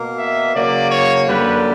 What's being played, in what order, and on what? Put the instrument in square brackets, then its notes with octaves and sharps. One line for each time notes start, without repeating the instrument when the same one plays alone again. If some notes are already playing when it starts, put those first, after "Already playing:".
Already playing: [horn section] B2 A#3
E5
C#3 F#3 A#3 D5
C#5
F#2 D3 G3 A#3 B4